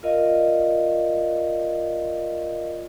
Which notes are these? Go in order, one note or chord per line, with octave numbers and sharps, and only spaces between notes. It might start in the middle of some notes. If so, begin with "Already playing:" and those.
F4 A#4 D5 D#5 F5